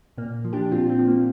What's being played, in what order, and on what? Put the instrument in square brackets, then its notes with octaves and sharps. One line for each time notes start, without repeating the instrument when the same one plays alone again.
[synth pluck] A#2 A#3
F3
D4 G4
A#2 C4 F4
C4
F3
A#3